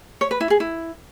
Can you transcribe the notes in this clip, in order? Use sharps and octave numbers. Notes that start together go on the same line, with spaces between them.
C#5
B4
E4
G#4
E4